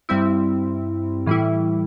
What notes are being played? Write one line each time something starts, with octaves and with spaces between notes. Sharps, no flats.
G2 G3 C4 E4
A2 E3 G3 E4